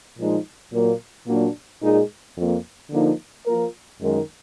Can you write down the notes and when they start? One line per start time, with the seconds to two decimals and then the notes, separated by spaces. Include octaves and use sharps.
0.18 A#2 F3 G#3 D#4
0.73 A#2 F#3 A#3
1.27 A#2 F#3 A#3 D4 F#4
1.82 A#2 G#3 D#4 G#4
2.36 F2 F3 A#3
2.91 D3 F3 A#3 D#4
3.46 F3 A#3 F4 A#4
4.01 F#2 D#3 G#3 D#4 A#4